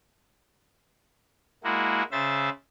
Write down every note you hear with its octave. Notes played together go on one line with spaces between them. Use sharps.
G#3 A#3 E4 F#4
C#3 C5 E5 A6